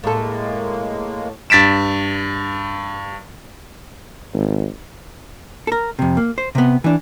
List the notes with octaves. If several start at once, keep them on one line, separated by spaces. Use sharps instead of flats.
A2 G#3 A#3 A4
G2 A6 B6 D7 E7
G#1
A4 A#4
F2 C3
A#3
C5
C3 B3
E3 D4